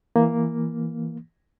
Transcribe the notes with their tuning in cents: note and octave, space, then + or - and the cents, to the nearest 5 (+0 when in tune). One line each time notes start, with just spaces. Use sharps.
E3 +0 A#3 +0